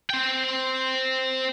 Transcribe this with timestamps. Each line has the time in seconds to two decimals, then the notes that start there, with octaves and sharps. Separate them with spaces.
0.10 C4 G5